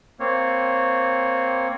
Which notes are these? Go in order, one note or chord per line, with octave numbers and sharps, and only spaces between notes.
A#3 C4 C#5